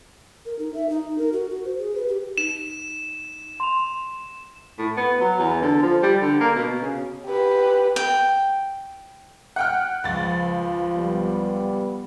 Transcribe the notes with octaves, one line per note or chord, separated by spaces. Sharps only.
A#4
D#4
E5
D#4
A#4
F#4
F#4
C5
G#4
B4
G4
D#4 E7
C6 F7
A2
B3
F#3
E2
D3
F3
G3
D3
A#3
B2
C#3
G4 B4
G5
F#5 G5 F6
C#2 F3 A6
G3 B3